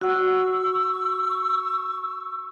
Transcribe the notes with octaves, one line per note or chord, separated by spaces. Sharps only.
F#4 F#5 C#6 E6